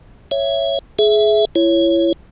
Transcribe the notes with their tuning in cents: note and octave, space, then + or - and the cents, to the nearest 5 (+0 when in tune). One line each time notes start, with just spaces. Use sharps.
C#5 +0 E5 +10
G#4 +25 E5 +0
E4 +30 C#5 +0